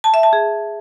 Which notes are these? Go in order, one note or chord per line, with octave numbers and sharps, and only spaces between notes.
A5
E5
A5
G#4